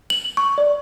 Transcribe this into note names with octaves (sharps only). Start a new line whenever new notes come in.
F#7
C#6
D5